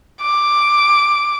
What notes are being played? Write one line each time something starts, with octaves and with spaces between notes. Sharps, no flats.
D6